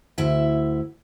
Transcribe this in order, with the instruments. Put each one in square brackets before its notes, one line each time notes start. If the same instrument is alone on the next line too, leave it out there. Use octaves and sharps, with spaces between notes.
[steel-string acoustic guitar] D2 E4 E5